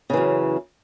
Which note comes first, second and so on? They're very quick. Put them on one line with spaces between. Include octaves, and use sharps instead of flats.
C#3 E3 F#2